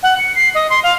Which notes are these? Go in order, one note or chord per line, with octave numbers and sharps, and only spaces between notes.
F#5
C#7
C7
D#5
C6
F5